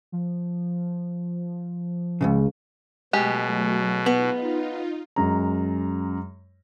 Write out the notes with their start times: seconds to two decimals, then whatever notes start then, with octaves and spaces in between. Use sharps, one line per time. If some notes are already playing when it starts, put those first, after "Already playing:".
0.12 F3
2.21 C#2 G2 C#3
3.13 B2 F#3 G#3 A3 G4
4.06 B3 D#4 F4
5.16 F#2 G#3 A#5